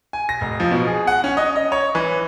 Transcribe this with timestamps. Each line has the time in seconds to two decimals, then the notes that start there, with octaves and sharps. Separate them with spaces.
0.13 G#5
0.29 A#6
0.41 F1
0.60 F3
0.71 B2
0.87 G#4
1.07 F#5
1.24 C#4
1.37 D#5
1.56 D#5
1.72 C#5
1.95 E3